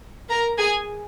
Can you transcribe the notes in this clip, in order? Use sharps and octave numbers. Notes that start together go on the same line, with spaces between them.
A#4 A#5
G#4 G#5